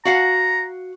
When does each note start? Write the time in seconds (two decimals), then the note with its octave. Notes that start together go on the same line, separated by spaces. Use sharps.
0.05 F#4 F5 F#5 A#5